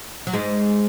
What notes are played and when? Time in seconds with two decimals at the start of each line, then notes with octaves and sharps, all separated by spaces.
0.27 F#3
0.33 G#2 G#3